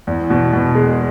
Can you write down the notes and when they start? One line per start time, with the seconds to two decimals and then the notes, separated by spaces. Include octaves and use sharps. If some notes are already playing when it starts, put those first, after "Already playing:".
0.07 E2
0.30 B2
0.53 B2
0.75 G#3